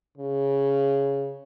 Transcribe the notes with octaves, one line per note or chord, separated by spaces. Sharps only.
C#3